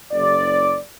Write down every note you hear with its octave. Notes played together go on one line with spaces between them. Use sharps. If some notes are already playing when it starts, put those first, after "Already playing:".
F#1 D5